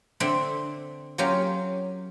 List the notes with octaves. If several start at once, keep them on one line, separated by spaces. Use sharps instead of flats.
D3 C4 D4 A4 E5 C6
F#3 A#3 C#4 F4 G4